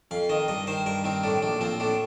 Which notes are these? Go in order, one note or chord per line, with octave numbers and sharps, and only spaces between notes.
F2 F5
D#3 D#5
G2 D#5
D#3 C5
G2 A#4
D#3 C4
A2 D4
A#1 D4
F3 C4
A2 D4